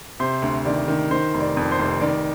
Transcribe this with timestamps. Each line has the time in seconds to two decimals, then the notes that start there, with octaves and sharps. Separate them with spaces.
0.20 C3 C5
0.42 D2
0.65 D#3 D5
0.88 D#3
1.11 D#3 C5
1.34 F1
1.41 D5
1.57 F2
1.72 C5
1.79 F1
2.01 D#3 D5